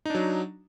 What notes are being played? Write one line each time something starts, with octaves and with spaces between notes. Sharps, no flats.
F#3 D4 D#4